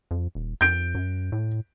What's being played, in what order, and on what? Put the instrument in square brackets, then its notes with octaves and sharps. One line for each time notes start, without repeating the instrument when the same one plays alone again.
[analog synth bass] F2
D#1
[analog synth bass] F2 [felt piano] G6 D7
[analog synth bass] F#2
A2